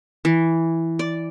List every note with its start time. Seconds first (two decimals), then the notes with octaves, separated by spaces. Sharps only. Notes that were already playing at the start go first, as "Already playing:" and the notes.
0.25 E3
0.99 D5